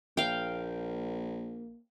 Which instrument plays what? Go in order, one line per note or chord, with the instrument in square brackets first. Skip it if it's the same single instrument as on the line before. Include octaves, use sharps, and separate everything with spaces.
[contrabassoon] A#1 [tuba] A#3 [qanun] F5 G5